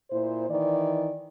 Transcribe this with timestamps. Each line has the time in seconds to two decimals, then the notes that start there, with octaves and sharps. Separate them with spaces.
0.11 A#2 E4 C5
0.50 D#3 E3 D5